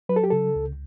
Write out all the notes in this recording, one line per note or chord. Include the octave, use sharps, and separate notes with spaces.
F#3 B4
A4
G4
C#3 A4
C#2